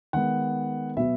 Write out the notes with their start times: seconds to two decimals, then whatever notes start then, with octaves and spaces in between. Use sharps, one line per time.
0.13 D#3 G#3 B3 F#5
0.97 B2 F#3 B3 E5